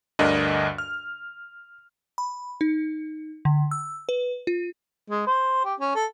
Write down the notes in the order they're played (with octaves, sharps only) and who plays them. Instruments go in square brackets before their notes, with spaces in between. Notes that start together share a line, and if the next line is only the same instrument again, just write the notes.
[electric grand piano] D2 G2 D3 D4 A#4 D#5
F6
[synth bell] B5
D#4
D3
E6
B4
F4
[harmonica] G#3
C5
G4
C#4
A4